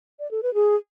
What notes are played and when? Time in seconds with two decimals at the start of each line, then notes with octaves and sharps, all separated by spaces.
0.20 D5
0.31 A4
0.43 B4
0.54 G#4